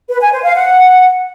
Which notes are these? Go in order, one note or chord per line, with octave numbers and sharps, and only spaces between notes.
B4
G#5
C5
F5
F#5